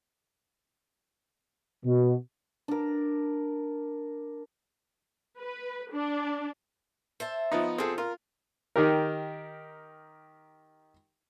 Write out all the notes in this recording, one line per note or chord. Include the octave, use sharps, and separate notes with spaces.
B2
D4 A#4
B4
D4
C5 E5 A5
F3 B3 D#4
C3 F3 C4 G#4 A4
F4 A#4
D#3 G4 A#4